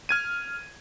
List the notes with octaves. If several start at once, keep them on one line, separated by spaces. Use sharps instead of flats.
F6 G#6 D#7